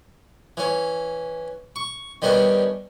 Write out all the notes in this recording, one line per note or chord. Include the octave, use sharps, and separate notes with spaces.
E3 C#4
C#6
D#3 G3 B3 C#4 D4